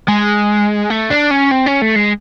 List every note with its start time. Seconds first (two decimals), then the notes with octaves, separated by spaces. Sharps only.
0.08 G#3
0.90 A3
1.10 D4
1.31 C#4
1.51 C4
1.66 C#4
1.82 A3
1.96 G#3